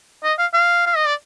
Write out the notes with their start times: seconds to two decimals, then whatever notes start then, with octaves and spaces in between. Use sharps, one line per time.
0.23 D#5
0.38 F5
0.53 F5
0.86 F5
0.96 D#5
1.06 D5